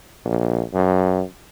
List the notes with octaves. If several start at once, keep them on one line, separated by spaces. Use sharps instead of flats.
A#1
F#2